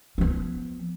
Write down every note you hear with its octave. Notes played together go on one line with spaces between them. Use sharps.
F3 B3